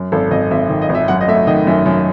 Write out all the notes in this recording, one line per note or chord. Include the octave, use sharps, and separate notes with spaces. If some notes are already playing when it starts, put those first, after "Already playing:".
Already playing: F#2
G#1 A4
G#1 D#5
G#1 E5
D#3
D#5
G#1
E5
F#2 F#5
D#5
A3 E5
D#3 D#5
F#2 E5
F#2